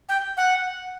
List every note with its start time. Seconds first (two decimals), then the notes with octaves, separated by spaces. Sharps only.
0.09 G5
0.37 F#5